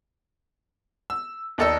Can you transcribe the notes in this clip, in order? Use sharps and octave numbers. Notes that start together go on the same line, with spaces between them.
E6
D#2 D#4 A4 D5 E6